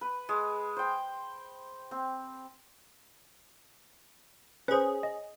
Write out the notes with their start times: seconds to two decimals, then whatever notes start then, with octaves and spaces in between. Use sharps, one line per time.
0.01 B4
0.29 G#3
0.77 C5 G5
1.91 C4
4.68 C#4 G#4 B4 C5
5.03 D#5